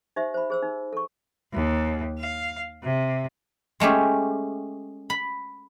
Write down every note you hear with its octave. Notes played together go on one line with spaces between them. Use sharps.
D#4 G4 C5 E5
C5 B5
G#4 C5 E6
D#4
A4 C#6
D#2
F5
C3
G#3 A3 C#4 G4
B5